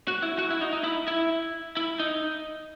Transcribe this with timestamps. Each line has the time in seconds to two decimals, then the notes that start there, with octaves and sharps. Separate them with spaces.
0.08 F#4
0.22 E4
0.39 F#4
0.50 E4
0.61 D#4
0.73 D#4
0.84 E4
1.08 E4
1.77 E4
2.00 D#4